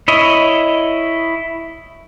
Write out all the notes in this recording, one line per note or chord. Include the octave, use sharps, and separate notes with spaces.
E4 C#5 D#5